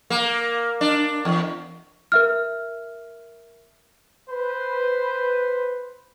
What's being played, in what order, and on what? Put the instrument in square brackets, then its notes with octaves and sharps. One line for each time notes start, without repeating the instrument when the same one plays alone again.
[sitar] A#3
D4
E2
[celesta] A#4 E5 F6
[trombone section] B4 [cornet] C5